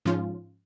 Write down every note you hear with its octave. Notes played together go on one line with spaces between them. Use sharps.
G#2 F3 C#4 F4